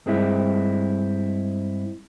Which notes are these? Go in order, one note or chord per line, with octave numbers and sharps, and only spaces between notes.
G2 G#3 C4 E4